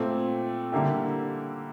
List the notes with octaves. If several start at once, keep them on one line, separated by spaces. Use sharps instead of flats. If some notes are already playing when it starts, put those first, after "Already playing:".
Already playing: A#2 A3 C4
D3 G3 A#3 E4 G4